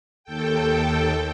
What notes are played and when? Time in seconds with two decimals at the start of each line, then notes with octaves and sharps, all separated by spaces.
0.24 D#2 A4 G5